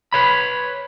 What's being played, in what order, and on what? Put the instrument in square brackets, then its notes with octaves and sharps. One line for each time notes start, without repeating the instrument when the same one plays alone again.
[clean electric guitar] B4 C#5 B5